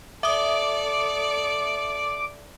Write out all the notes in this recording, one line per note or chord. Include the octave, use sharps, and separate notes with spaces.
A4 D5 E5 D6 D#6